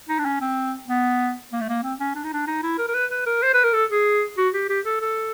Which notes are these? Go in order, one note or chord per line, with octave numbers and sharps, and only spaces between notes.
D#4
D4
C#4
C4
B3
A#3
A3
A#3
C4
C#4
D4
D#4
D4
D#4
E4
A#4
A#4
B4
B4
A#4
C5
B4
A#4
A4
G#4
F#4
G4
G4
A4
A4